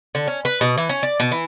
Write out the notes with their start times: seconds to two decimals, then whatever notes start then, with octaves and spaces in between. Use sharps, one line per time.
0.15 D3
0.28 C#4
0.45 B4
0.61 B2
0.78 E3
0.89 C#4
1.03 D5
1.20 B2
1.32 E3